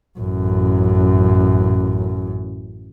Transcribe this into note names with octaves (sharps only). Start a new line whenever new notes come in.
A1 F#2